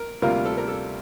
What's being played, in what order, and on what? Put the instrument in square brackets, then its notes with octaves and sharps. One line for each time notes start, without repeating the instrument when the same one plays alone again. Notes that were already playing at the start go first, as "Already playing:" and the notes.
Already playing: [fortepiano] A#4
[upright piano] D2 C3 G3 A#3 F4 [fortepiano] A#4
[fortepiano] A4
A#4
A4